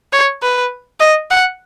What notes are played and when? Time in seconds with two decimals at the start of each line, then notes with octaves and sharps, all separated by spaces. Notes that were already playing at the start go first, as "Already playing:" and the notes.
0.13 C#5
0.42 B4
1.00 D#5
1.31 F#5